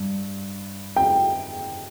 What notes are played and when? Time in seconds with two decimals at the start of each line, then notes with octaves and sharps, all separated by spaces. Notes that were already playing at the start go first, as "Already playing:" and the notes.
Already playing: G2
0.96 G5